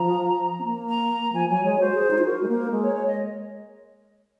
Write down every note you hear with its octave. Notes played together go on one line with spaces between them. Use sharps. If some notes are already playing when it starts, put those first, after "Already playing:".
Already playing: F3 A#5
C4
A#3
A#5
F3 G#5
F#3 G#5
G#3 C#5
F#4 C5
G#4
D#4
F4
F#4 A#4
G#3
A#3 A#4
G#3 A#4
C#5
C#5
D#5